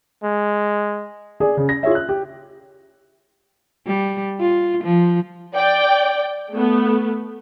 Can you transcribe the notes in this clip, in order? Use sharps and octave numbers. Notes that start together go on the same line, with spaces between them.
G#3
G#4 D5 G#5
C#3
A#6
F4 G#4 C#5 E5
F#6
G4
G3
F4
F3
D5 G5
A3 B3